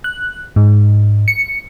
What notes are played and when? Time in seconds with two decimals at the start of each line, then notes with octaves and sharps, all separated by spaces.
0.04 F#6
0.56 G#2
1.28 C#7